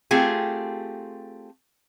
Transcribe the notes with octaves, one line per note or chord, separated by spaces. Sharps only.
A3 C4 F4 G4 G#4